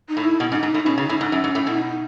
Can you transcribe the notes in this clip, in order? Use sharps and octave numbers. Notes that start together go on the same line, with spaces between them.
D#4
A2
E4
B2
G#2 C#4
D#4
G#2
A2 D#4
B2 C#4
C#3
D#4
A2
G#2 D#4
F#2 C#4
G#2
A2
B2 E4
D#4